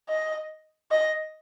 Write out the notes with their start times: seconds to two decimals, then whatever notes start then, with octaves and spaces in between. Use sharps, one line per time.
0.09 D#5
0.91 D#5